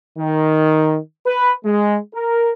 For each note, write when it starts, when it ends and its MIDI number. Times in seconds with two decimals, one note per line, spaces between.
0.18 0.98 51
1.27 1.53 71
1.65 1.98 56
2.15 2.52 70